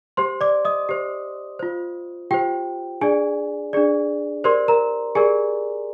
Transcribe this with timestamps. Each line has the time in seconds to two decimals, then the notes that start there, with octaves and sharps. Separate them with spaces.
0.17 G4 C5 C6
0.41 D5 D6
0.65 D#5 D#6
0.89 G4 C5
1.59 F4 C5
2.31 F4 G4 C5 G5
3.01 D4 G#4 D5 G#5
3.73 D4 G#4 D5
4.44 G4 A#4 C5 D5 C6
4.68 A#4 A#5
5.15 G4 G#4 A#4 D5 G#5